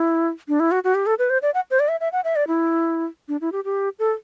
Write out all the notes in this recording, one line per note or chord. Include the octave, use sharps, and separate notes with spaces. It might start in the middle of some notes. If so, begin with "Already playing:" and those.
Already playing: E4
D4
E4
F#4
F#4
G4
A4
B4
C5
D5
F#5
C5
D5
E5
E5
F#5
E5
D5
E4
D4
E4
G4
G4
A4